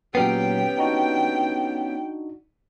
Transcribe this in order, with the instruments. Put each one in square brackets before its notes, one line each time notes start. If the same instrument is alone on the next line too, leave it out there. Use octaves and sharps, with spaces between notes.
[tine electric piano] A#2 F#3 C7 [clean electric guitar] B3 C#4 G4 [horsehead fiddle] G5
[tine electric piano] D4 D#4 F#4